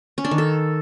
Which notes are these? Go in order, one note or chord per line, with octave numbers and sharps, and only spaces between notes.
C#4
D4
D#3
A4